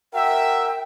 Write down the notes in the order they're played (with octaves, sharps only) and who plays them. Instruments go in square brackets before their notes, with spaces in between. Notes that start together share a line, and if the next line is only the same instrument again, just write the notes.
[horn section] F#4 A#4 E5 [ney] G5